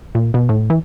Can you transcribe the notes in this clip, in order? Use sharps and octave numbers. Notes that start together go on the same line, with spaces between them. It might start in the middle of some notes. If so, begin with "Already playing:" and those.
A#2
B2
A2
E3